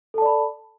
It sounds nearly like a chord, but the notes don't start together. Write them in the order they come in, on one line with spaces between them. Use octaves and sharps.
A4 A5 D5 B5